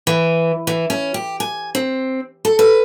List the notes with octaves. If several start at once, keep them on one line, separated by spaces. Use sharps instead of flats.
E3
E3
C#4
G4
G#5
C4
A4
B4